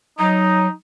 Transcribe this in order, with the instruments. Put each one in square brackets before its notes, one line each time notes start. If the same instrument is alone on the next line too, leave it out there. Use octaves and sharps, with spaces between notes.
[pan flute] F#3 [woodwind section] D#4